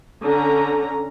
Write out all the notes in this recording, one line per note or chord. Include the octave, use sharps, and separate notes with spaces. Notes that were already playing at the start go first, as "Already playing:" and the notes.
D3 C#4 A#5